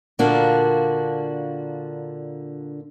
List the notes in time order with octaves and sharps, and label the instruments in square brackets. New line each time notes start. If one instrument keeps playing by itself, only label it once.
[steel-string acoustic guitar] A#2 D3 A#3 D4 F4 F#4